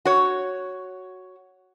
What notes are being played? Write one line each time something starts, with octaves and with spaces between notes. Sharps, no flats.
F#4 C#5